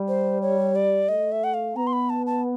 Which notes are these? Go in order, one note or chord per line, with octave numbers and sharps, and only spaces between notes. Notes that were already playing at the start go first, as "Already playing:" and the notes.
Already playing: G3
C5
C#5
D5
A3 D#5
E5
F#5
F5
B3 A#5
C6
B5
A5
A5